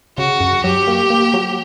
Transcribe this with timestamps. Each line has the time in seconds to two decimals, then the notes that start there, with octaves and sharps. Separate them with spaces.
0.18 C#3 F#4
0.40 F#2
0.64 F#3 G4
0.87 A#3
1.10 A#3
1.34 F#3